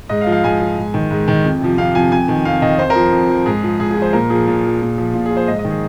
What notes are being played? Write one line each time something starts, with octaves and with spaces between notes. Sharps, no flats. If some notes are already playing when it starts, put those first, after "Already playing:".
G#2 D#5
F5
F3
F5
G#2 G#5
F3
G#2
D#3
G#2
D#3
F2
C3 F3
F2 F5
C3 F3 G#5
F2 G#5
D#3
F2 F5
D#3 D#5
F2 C5
A#4
F3
F2
F3
G#2 G#4
F3
G#2 G#4
G#4
F3
C5
A#2 A#4
F3 G#4
A#2
F3
A#2
F3
A#2 F4
G#4
F3
C5
G#2 D#5
D#5
D#3
G#4